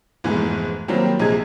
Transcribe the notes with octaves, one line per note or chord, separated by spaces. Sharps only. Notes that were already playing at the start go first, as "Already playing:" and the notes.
F1 G#2 B2 E3 G#5
D#3 F#3 G3 A#3 C4
A#1 C3 G#4 D#5 G#6